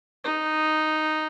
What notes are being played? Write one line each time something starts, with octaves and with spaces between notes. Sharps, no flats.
D#4